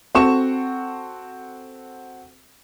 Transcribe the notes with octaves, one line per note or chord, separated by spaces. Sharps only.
C4 F#4 A4 C#6 E7